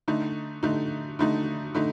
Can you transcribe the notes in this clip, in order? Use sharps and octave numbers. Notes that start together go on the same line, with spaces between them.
D3 A3 D#4
D3 A3 D#4
D3 A3 D#4
D3 A3 D#4